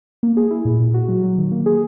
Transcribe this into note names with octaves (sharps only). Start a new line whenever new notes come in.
A#3
G#4
E4
A#2
A#2
F#4
F#3
F#3
D#3
A#3
G#4